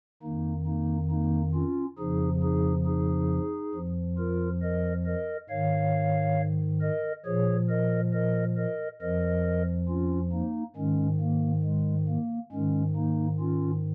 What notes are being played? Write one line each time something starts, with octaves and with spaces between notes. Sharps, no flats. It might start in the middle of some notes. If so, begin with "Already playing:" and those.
F2 D#3 A#3 D#4
A#3 D#4
A#3 D#4
C#4 F4
F2 C#3 F3 D#4 G#4
D#4 G#4
D#4 G#4
F2 F3
F4 A#4
A#4 D#5
A#4 D#5
G#2 D#3 C#5 F5
A#4 D#5
A#2 F3 G#4 C#5
A#4 D#5
A#4 D#5
A#4 D#5
F2 F3 A#4 D#5
C#4 F4
A#3 D#4
G#2 D#3 G#3 C#4
A#3
G#3
A#3
G#2 D#3 G#3 C#4
A#3 D#4
C#4 F4